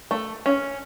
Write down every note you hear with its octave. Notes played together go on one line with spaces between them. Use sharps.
A3
C#4